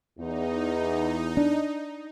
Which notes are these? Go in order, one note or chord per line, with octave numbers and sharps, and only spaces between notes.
E2 D#4
D4